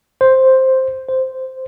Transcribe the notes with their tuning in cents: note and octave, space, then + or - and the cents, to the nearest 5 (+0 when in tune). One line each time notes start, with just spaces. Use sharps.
C5 +5
C5 -5